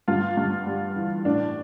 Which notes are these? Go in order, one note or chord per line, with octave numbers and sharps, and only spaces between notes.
G2 F4
G2
G3
E3
A2 D4